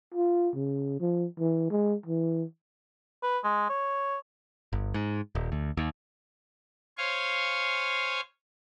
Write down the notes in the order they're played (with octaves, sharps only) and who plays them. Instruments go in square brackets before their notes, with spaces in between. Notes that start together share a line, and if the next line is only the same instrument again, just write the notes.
[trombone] F4
C#3
F3
E3
G#3
E3
[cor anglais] B4
G#3
C#5
[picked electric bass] G1
G#2
D#1
D2
D#2
[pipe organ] C5 C#5 F5 G#5 C#6